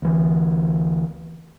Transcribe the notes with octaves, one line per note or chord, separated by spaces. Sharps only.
D2 E3